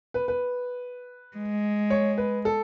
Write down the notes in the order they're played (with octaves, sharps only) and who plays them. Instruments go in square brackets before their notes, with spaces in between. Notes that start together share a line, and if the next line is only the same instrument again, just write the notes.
[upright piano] B4
B4
[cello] G#3
[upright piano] C#5
B4
A4